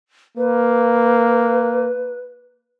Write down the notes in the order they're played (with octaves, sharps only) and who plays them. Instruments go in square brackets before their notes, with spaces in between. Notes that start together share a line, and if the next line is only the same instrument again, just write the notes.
[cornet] A#3 [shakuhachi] B4